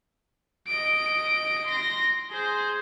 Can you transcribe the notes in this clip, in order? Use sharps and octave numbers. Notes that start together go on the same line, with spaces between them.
D#5 D7
C6 A#6
G#4 C5